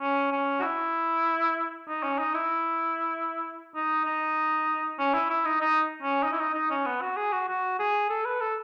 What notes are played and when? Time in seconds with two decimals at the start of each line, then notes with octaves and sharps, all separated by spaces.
0.01 C#4
0.32 C#4
0.59 F#4
0.63 E4
1.88 D#4
2.03 C#4
2.19 D#4
2.34 E4
3.75 D#4
4.05 D#4
4.99 C#4
5.14 E4
5.30 E4
5.45 D#4
5.61 D#4
6.03 C#4
6.23 D#4
6.32 E4
6.39 D#4
6.54 D#4
6.71 C#4
6.86 B3
7.02 F#4
7.17 G#4
7.33 F#4
7.48 F#4
7.79 G#4
8.10 A4
8.25 B4
8.41 A4